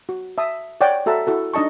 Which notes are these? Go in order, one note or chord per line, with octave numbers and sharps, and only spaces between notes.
F#4
E5 A5 D#6
C#5 D5 F#5 G5
F#4 A4 E5 F#5 A5 A#5
E4 F#4 A4
D4 D#4 D#5 A5 C#6